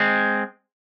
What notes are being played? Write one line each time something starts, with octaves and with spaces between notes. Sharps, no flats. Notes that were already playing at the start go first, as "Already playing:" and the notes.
Already playing: G#3 C4